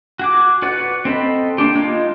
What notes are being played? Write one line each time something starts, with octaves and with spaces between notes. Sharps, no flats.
F#4 G#4 D6
F#4 B4 D5 F#5
C4 A4 D#5 B5
A#3 C#4 D4 G4
G#3 D#4 F4